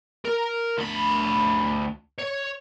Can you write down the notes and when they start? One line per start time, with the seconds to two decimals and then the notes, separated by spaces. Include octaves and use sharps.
0.25 A#4
0.78 D2 B5
2.19 C#5